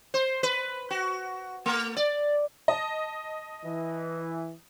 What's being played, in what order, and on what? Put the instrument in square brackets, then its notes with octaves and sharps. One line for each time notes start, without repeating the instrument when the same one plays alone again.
[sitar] C5
B4
F#4
A3
D5
[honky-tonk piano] D#5 A5
[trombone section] E3